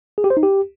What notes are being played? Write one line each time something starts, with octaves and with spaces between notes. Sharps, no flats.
G#4
G4
C5
D#4
G4